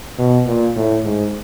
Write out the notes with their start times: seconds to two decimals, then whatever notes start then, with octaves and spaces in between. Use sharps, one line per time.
0.19 B2
0.47 A#2
0.76 A2
1.05 G#2